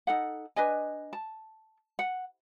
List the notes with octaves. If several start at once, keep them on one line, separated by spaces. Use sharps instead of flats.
D#4 A4 F#5
D4 B4 D#5 G#5
A5
F#5